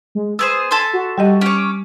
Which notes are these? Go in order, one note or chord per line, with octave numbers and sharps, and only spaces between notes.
G#3
B3 G#4 C5 D#6 E6
A4 E5 G#5 C6
F#4
G3 G4 D#5
C#4 C#5 D6